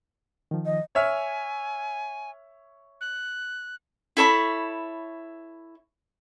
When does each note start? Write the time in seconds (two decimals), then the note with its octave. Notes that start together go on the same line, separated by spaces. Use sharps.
0.51 D#3 F3
0.66 D#5
0.95 C#5 E5 G#5 F6
3.01 F#6
4.17 E4 A4 C#5 B5